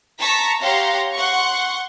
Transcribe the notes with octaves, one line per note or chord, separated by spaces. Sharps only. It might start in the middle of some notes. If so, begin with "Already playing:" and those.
A5 A#5 C#6 B6
G4 C#5 F5 F#5 A#5 C6
F#5 C6 C#6